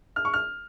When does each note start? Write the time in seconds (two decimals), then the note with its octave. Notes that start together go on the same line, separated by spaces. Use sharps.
0.16 F6
0.25 C#6
0.34 F6